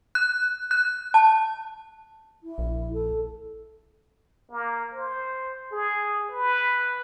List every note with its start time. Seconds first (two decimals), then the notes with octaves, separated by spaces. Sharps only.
0.15 F#6
0.71 F#6
1.14 A5
2.42 E4
2.58 A#1
2.93 A4
4.51 A#3
4.94 C5
5.72 G#4
6.31 B4